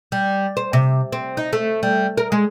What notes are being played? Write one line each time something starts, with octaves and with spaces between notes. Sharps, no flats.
G3
C5
C3
C4
D#4
A3
G3
A#4
G#3